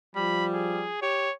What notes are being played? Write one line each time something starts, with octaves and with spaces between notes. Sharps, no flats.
F3 G3 B5
G#4
G4 C#5